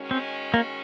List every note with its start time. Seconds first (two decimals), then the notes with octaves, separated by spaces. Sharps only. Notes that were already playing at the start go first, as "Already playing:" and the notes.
Already playing: D#3 G#3 C#4 F#4
0.11 C4
0.54 A#3